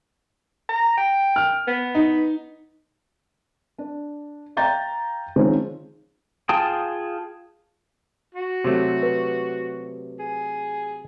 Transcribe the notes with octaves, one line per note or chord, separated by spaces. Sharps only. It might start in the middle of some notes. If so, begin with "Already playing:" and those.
A#5
G5
F6
B3
D#4
D4
F5 G5 A#5 G6 A6
D#3 F3 G#3 C4 C#4 D#4
F4 G#4 G5 A5 D#6
F#4
C3 F#3 A3
B4
G#4